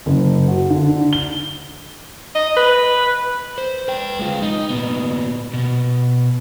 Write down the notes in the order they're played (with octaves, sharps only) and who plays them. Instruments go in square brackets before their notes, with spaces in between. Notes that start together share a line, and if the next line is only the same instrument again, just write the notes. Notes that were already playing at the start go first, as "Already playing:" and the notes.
[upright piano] F#1
F#4
D3
D3
G7
[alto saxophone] D#5
B4
[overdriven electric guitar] C5
B4 G5
G#3 F4
D#4
A#2 B3
B2